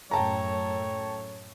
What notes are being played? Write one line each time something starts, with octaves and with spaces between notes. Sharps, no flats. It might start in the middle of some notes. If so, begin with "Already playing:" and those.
F#2 A2 A3 C#5 G5 A5 A#5